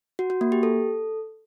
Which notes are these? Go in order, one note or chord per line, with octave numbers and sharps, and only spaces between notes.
F#4
F#4
A#3
G4
A4